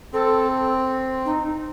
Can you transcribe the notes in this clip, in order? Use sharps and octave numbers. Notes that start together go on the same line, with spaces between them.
C4 A4
D#4